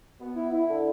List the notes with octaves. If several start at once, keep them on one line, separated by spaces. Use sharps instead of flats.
B3
E4
E4
D3